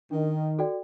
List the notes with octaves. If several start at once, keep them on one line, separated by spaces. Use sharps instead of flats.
D#3 D4
F#4 A4 D5 G5